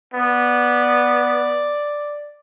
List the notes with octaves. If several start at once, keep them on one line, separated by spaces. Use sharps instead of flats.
B3 D5